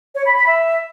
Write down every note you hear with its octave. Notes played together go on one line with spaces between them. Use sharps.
C#5
B5
B5
E5